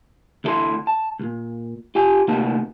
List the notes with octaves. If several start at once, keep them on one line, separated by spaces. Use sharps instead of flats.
D2 G#3 A3 E4 A4 C6
A5
C2 A#2
F4 G4 G#5
D2 C3 A#3 B3 D#4 A5